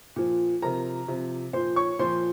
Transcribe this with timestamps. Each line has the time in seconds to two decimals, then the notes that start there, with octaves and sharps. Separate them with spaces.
0.16 A#2 F3
0.62 C3 F3 A#4 A#5
1.08 C3 F3
1.53 A#2 F3 C5 C6
1.76 C#5 C#6
1.99 A#2 F3 C5 C6